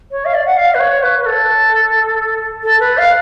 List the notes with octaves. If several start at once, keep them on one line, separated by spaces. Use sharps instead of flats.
C#5
F5
D5
F#5
F5
B4
C#5
B4
B4
A4
A4
B4
F5